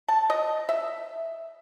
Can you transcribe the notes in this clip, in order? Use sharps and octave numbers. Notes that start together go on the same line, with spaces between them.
A5
D#5
E5